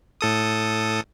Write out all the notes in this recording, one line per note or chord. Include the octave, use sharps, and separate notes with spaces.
A2 A4 D#6